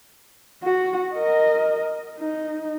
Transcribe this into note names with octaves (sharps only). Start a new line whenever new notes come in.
F#4
A#4 D#5
D#4